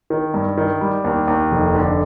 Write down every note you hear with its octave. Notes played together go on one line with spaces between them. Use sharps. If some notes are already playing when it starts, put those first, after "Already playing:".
D#3
G2
D#3
G3
D#2
D#2
F1
D3